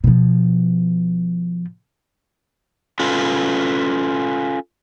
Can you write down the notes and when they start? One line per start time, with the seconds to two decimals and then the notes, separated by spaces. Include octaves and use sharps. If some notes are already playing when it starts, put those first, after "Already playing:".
0.04 B2 F3
3.00 C#4 F4 A4 B4